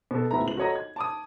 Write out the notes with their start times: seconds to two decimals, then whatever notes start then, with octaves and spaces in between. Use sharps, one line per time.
0.11 B2 A4
0.31 D1 A2 B3 E4 A#5
0.45 C#2 F#7
0.57 F#4 A4 C#5 D#5 A#5
0.76 G#6
0.96 A5 D6 D#6